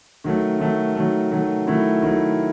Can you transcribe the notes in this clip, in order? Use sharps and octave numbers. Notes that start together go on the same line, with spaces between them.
D#3 F#3 A3
D#3 F#3 A3
D#3 F#3 A3
D#3 F#3 A3
D#3 F#3 A3 E4
D#3 F#3 A3 E4